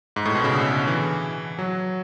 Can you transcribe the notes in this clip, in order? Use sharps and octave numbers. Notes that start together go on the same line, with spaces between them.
G#2
A2
B2
C#3
D3
E3
F#3